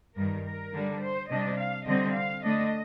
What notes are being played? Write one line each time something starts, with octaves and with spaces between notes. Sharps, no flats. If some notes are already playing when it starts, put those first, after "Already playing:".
G2 D#3 G3 A#4
A#4
D3 G3 D4
C5
C3 G3 D4 D#5
F5
D3 G3 C4 D#5
F5
D3 A3 D4 D#5